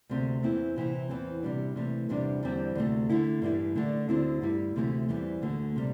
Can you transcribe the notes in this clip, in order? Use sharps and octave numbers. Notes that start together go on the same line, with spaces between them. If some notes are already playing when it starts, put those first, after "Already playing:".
D2 C3 A3 C4
E2 E3 C4 E4
C3 E3 C4 E4
E2 E3 C4
C3 G3 D4
C3 E3 A3
E2 C3 G3 D4
E2 D3 G3 C4
D2 C3 A3
D3 A3 E4
G2 E3 G3 E4
D3 A3 D4
D2 D3 C4 E4
G2 G3 E4
D2 C3 E3 A3 E4
E2 E3 G3 C4 E4
D2 D3 A3
C3 G3